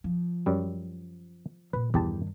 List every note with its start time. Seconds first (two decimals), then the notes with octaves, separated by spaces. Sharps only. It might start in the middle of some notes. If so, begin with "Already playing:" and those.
0.04 F3
0.46 F#2 G3
1.73 A#2 B4
1.94 E2 G2 D#3 G4 A5